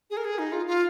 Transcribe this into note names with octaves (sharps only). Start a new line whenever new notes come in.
G#4
A#4
G#4
D#4
F4
F4